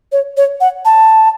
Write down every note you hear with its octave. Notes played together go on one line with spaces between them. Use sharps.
C#5
C#5
F#5
A5